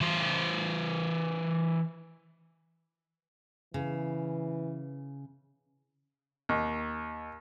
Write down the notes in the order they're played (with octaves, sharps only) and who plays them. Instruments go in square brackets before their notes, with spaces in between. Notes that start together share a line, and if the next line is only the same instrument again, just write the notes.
[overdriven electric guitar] E3 C5
[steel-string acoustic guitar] C#3 [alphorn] E3
[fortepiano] D#2